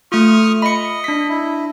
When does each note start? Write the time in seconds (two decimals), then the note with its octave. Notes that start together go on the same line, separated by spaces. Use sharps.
0.12 A3 F4 C#6 D#6 F6
0.62 D#5 B5 C#7
1.04 D4 B6
1.29 E4